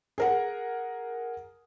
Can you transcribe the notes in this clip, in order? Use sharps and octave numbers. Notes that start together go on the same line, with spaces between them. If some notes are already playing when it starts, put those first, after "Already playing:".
G#4 A#4 F#5